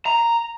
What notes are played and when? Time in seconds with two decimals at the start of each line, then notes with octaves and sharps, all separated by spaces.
0.06 A#5